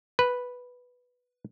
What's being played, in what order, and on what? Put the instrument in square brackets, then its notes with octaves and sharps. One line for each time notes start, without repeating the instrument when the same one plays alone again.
[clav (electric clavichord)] B4